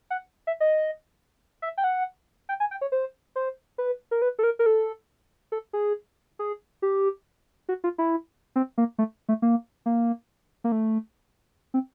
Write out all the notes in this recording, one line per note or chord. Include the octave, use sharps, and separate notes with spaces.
F#5
E5
D#5
E5
G5
F#5
G5
G#5
G5
C#5
C5
C5
B4
A#4
B4
A4
A#4
A#4
A4
A4
G#4
G#4
G4
F#4
F4
E4
C4
A#3
A3
A3
A#3
A#3
A#3
A3
C4